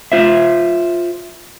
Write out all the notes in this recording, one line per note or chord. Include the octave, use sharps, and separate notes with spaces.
F4 C5 E5